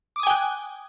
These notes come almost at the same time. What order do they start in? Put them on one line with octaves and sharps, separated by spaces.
D6 D#6 G#5 G5 F#6